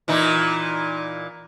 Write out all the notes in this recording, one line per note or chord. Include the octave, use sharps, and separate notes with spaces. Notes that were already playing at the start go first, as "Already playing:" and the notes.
A#2 E3 D#4